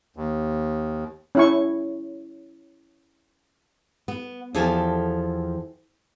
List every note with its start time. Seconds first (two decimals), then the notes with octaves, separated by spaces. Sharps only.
0.16 D#2
1.35 C#4 E4 C#6
4.08 B3
4.55 E2 F3 G4 A4 G#5 A5